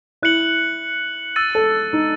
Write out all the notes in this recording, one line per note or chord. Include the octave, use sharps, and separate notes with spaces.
E4 F#6 C#7 F#7
E6 A6 D#7
A4
D#4